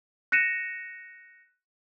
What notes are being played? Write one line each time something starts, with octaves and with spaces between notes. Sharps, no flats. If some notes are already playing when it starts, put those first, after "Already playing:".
F#6 A#6 C#7 D#7 E7